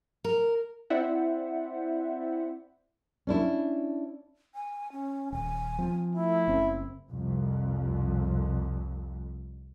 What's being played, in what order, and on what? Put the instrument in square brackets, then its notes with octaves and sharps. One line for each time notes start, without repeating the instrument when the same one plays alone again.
[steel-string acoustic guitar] A#4
[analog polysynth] C4 E4 C5 D5 E5 F#5
[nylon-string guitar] C#4 D4 E4
[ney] G#5
C#4
[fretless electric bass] D#1 [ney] G#5
[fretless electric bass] F3 C4
[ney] A3 [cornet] E4
[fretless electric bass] F#1 C4 C#4
[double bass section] C2 F2